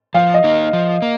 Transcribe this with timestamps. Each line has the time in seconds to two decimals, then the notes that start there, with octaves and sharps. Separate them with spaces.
0.14 F3 F5
0.34 D#5
0.44 A#3 D#4
0.73 F3
1.02 A#3